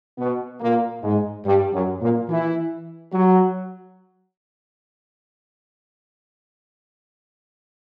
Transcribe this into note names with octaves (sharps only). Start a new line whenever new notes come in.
B2 B3
A#2 A#3
G#2 G#3
G2 G3
F#2 F#3
A#2 A#3
E3 E4
F#3 F#4